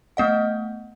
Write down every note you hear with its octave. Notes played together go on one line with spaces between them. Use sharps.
A3 B3 D#5 F#5